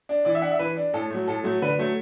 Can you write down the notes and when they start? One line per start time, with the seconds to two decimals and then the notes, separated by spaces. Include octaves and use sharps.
0.09 D4
0.25 E3 D5
0.35 E5
0.42 D4 F#5
0.51 E5
0.59 E3 B4
0.77 D4
0.94 A2 A4
1.10 F#3 A3
1.27 A2 A4
1.44 F#3 A3
1.62 D3 B4
1.79 F#3 A3